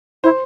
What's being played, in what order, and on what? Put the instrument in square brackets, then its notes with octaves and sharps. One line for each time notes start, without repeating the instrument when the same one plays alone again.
[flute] E4 [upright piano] C5